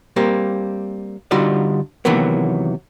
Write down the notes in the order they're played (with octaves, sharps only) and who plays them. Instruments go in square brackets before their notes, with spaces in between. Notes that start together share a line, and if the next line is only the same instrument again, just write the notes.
[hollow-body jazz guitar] G3 A#3 C4 G4
D3 G3 D#4 F4 F#4 D5
C3 D#3 E3 F#3 A#3 B3